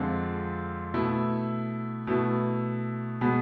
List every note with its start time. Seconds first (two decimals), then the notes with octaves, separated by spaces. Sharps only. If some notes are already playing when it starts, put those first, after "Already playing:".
Already playing: F2 D3 G#3 C4 F4
0.94 B2 A3 E4
2.07 B2 A3 E4
3.21 B2 G#3 B3